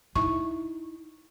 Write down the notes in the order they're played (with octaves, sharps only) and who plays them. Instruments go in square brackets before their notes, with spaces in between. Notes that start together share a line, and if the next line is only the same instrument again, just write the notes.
[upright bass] D#4 E4 [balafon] C#6